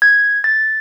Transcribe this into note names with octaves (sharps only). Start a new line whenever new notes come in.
G#6
A6